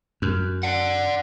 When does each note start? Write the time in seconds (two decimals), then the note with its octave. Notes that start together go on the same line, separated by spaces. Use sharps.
0.22 F#2
0.63 D5 F#5